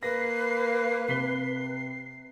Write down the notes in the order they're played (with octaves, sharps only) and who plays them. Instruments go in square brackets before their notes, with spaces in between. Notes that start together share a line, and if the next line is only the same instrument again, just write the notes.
[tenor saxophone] A#3 [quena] B4 [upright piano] A#6 [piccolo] C7
[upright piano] C3 B6 G7 [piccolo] C7